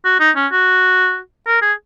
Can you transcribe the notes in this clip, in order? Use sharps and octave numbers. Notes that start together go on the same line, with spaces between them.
F#4
D#4
C#4
F#4
A#4
G#4